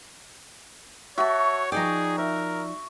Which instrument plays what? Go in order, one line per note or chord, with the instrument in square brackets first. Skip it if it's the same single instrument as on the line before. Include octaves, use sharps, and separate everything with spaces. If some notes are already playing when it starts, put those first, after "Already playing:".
[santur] F#4 [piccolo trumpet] C#5 [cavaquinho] E5 A5
[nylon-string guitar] F3 D#4 D5 [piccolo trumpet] G#4 [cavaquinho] G5 A#5
[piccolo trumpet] A#4 [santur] E5